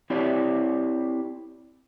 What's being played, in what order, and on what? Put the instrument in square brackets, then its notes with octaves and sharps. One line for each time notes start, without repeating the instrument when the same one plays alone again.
[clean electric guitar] C4 E4 G4 C#5 D5